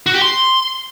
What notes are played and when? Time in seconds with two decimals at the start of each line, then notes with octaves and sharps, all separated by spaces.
0.06 F#4
0.14 G4
0.22 C6